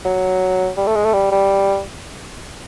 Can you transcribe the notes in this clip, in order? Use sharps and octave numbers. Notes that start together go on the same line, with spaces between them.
F#3
G3
A3
G#3
A3
G3
G3